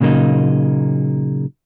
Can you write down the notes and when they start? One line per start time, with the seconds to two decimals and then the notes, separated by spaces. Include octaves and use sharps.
0.01 A#2 C#3 F#3 A#3 D#4